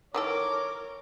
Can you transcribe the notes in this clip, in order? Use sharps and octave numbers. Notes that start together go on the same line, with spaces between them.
D#3 E3 A4 A#4 C#5 D6